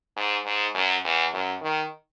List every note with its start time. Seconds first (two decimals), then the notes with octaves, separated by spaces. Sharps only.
0.17 G#2
0.46 G#2
0.75 F#2
1.05 E2
1.34 F#2
1.62 D#3